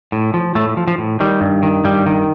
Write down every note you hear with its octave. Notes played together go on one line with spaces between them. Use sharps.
A2
F3
A2 A3
F3
F3
A2
D#3 G3
G2
D#3
G2 G3
D#3